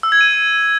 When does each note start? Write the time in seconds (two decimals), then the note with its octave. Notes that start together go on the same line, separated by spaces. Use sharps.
0.03 E6
0.12 G#6
0.21 D#7